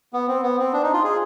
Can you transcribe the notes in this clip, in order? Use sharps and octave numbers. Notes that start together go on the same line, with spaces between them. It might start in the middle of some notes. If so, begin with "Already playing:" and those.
B3
C4
B3
C4
D4
D#4
F4
G#4